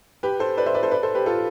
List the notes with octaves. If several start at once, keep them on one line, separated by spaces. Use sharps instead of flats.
G4 B4
A4 C5
B4 D5
C5 E5
B4 D5
A4 C5
B4 D5
A4 C5
G4 B4
F4 A4